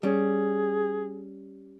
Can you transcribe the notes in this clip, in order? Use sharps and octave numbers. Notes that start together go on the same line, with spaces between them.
G3 C#4 G#4